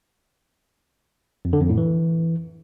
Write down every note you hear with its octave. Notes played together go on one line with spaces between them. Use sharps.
F2
D3
F2
A2
E3